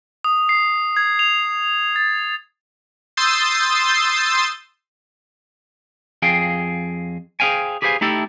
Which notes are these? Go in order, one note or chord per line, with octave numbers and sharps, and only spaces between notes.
D#6
C7
G#6
F7
A6
C6 D#6 E6 G6 A6 C7
F2 G#4 F5 G5
G#4 B4 C5 F5 G5 G#5
G4 G#4 B4 C5 F5 G#5
A3 D#4 E4 G4 A4